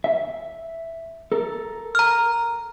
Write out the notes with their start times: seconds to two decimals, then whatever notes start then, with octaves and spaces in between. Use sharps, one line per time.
0.04 E5
1.32 A4 A#4
1.95 A#5 F6